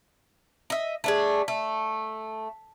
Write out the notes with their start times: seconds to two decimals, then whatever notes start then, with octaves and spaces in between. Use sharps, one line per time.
0.70 D#5 E5
1.04 A3 D4 G#4
1.48 A3